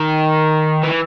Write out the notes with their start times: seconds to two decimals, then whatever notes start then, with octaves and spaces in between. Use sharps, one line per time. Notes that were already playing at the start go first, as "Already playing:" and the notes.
Already playing: D#3
0.83 E3